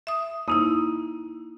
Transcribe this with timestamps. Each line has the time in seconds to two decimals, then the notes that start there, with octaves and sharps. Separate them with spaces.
0.07 E5 D#6
0.48 A#3 D#4 E4 D#6